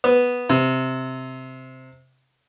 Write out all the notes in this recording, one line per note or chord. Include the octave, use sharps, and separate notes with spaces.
B3
C3